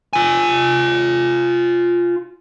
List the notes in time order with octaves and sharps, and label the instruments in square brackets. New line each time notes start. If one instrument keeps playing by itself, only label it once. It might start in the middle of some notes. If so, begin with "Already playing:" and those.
[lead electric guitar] F4 G#5